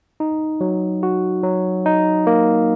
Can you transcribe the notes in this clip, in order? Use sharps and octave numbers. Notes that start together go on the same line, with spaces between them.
D#4
F#3
F#4
F#3
D#4
A#3